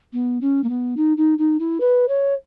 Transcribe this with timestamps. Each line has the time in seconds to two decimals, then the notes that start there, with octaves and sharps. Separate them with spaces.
0.13 B3
0.41 C#4
0.64 A#3
0.69 B3
0.97 D#4
1.17 D#4
1.38 D#4
1.59 E4
1.80 B4
2.08 C#5